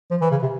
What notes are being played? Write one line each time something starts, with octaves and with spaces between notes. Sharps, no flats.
F3
E3
C#3
C3